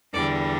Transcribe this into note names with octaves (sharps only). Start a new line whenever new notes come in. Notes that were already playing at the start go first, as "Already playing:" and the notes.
E2 D3 G3 A4 D5